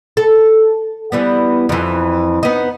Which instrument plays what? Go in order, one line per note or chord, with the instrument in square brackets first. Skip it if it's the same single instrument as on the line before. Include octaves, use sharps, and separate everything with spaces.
[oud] A4
E3 G3 B3
F2 E3
B3 D#4